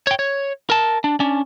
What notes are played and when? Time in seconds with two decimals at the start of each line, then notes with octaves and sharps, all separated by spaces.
0.07 C#5 G5
0.19 C#5
0.70 A#4 A5
1.04 D4
1.20 C#4 D4